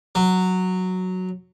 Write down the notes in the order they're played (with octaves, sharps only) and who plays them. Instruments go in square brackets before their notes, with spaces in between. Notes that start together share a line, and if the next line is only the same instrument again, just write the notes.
[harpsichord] F#3